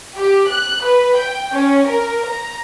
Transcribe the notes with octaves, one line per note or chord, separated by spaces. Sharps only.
G4
F#6
B4
G5
C#4
A#4
A#5